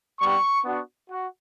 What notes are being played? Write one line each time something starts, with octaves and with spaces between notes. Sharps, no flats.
G3 B3 D4 G4 C#6
B3 D4 F#4
F#4